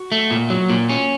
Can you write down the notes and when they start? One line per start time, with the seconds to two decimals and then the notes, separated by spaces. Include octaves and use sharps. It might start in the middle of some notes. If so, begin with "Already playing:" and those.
Already playing: F#4
0.12 A3
0.31 A#2
0.50 F#3
0.70 A#2
0.89 C#4